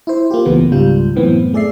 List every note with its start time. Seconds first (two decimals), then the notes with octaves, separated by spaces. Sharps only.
0.07 E4 C5
0.31 A#3 F4 G4
0.45 C#2 A#2 E3 A3 B3
0.72 G#1 C#2 G#2 G3 F4 G6
1.15 F#2 A2 E3 B3 C4
1.53 A3 G#4 D5 E5 C7